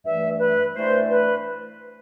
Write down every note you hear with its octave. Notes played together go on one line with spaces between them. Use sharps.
G2 E3 A3 E5
B4
G2 E3 A3 C5
B4